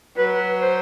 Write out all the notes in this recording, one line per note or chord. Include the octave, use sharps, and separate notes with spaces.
F#3 B4
C5